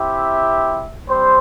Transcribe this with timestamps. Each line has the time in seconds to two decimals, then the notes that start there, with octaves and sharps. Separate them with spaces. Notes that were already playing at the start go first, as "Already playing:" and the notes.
Already playing: C4 E4 G4 E5
1.08 G3 C4 C5